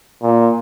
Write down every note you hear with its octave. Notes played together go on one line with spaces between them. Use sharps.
A#2